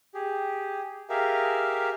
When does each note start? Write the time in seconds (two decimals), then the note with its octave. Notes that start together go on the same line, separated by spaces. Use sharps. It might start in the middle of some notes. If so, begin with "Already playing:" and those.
0.14 G4 G#4
1.10 G4 G#4 A#4 E5 F5